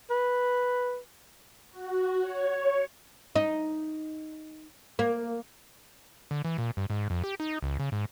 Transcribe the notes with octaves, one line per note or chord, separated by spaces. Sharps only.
B4
F#4
C#5
D#4
A#3
D3
E3
A#2
G2
G#2
F2
G4
D#4
C#2
C#3
G#2